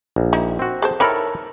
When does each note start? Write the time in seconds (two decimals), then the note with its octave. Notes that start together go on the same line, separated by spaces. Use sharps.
0.16 A#1
0.33 D#4 E4
0.59 C4 F#4
0.82 G#4 A4 C5
1.00 D#3 E3 A4 A#4 C#5 B5